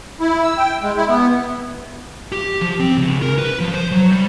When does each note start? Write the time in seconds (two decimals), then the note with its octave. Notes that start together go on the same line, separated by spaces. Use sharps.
0.20 E4
0.44 E6
0.57 G5
0.82 G#3
0.97 E4
1.09 B3
2.32 G4
2.62 F3
2.80 C4
2.98 C#2
3.22 A#4
3.38 B4
3.60 F3
3.74 C5
3.91 F#3
4.12 G3